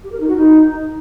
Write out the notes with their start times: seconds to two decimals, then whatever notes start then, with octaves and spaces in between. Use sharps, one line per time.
0.04 G4
0.12 A#4
0.20 D#4
0.28 F#4
0.37 D#4